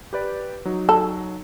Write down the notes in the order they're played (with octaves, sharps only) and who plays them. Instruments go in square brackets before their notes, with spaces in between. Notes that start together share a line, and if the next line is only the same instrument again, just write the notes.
[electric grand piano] G4 B4 D5
F#3 D#4
[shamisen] A4